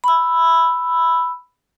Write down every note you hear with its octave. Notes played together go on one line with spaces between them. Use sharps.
B5 E6